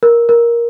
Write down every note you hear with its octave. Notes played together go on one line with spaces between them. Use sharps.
A#4
A#4